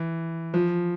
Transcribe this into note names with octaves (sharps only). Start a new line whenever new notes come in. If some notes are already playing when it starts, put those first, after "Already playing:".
Already playing: E3
F3